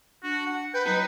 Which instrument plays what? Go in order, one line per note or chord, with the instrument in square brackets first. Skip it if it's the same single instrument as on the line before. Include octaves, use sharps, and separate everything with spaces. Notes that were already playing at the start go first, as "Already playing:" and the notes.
[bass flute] D4 [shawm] F#4
[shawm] F#5
[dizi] B4 [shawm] G5
[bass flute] F#3 [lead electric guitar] D#4 A#5 [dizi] B4